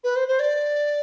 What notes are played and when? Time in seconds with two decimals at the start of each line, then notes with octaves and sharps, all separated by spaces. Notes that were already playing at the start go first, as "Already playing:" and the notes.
0.04 B4
0.16 C5
0.28 C5
0.39 D5